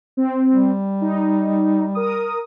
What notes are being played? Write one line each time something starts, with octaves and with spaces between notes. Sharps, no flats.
C4
G3
D#4
A#4 D#6